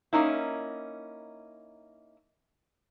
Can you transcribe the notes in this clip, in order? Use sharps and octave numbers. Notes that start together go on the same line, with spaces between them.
A#3 C#4 D#4 E4